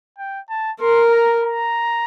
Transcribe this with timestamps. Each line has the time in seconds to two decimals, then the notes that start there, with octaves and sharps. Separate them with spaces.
0.18 G5
0.50 A5
0.80 A#4 C6
1.11 A#5
1.43 A#5